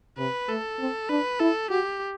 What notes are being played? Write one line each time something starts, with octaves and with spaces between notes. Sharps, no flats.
C3 B4
A3 A4
C4
D4 B4
E4 A4
F#4 G4